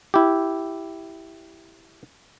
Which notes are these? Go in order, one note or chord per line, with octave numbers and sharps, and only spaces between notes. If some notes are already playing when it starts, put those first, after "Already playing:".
E4 G4